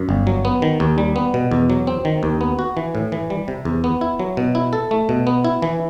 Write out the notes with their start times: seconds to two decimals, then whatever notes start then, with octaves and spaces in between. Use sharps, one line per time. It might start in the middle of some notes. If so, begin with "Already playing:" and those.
Already playing: F#2
0.09 G1
0.27 F#3
0.45 B3
0.62 D#3
0.80 D#2
0.98 G3
1.16 B3
1.34 B2
1.51 E2
1.70 F#3
1.87 C4
2.05 D#3
2.23 D#2
2.41 B3
2.59 F#4
2.77 E3
2.95 A2
3.12 E3
3.30 G3
3.48 C3
3.65 E2
3.84 B3
4.01 E4
4.19 F#3
4.37 B2
4.55 E4
4.73 A4
4.91 A3
5.09 B2
5.27 B3
5.45 E4
5.62 E3